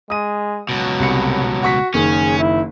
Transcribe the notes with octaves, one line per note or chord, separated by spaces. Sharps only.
G#3 D#6 D#7
C#2 B2 F#3
C2 C#7
F#4 C#6 B6
F#1 D#3 C#4 G#4
E4